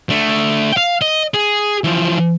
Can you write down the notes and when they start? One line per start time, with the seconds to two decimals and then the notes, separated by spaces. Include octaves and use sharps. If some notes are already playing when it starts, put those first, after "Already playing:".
0.09 D3 A3
0.72 F5 G5
1.02 D#5
1.34 G#4
1.84 E3 F3